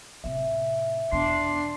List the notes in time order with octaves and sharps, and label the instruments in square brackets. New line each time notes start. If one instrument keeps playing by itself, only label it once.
[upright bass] A2 C3 [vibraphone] E5
[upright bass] E2 B2 [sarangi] D4 [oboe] C6